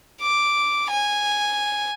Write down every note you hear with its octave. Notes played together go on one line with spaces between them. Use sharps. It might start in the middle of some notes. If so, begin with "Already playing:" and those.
D6
G#5